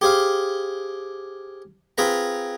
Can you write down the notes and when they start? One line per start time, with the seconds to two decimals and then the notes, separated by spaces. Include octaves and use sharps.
0.01 G4 G#4 C5 F5
1.98 C4 F4 G#4 B4 A#5